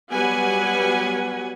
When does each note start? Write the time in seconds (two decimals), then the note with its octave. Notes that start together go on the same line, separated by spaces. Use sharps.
0.13 F#3 G3 B3 B4 F#5 G#5